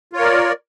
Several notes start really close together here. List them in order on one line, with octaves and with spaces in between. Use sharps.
F4 C#5 A#4 D5